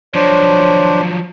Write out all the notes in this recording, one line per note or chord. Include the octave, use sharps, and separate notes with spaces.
F3 F#3 D4 C5 C#5